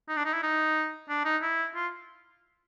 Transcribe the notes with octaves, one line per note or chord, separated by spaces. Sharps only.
D#4
D4
D#4
E4
D#4
D4
D#4
E4
F4